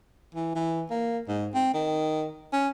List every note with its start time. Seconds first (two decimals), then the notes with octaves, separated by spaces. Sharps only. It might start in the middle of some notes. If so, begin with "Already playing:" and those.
0.35 E3
0.55 E3
0.90 A#3
1.28 G#2
1.54 C4
1.74 D#3
2.53 C#4